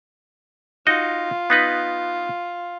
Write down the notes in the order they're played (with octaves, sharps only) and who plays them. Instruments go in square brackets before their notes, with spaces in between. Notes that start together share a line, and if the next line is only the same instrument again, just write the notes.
[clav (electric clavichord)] D#4 F#4 D#5 [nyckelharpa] F4
[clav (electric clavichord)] B3 D#4 B4